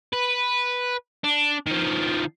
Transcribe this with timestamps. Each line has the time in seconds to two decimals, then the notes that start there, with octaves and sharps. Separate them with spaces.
0.13 B4
1.24 D4
1.66 D#3 F3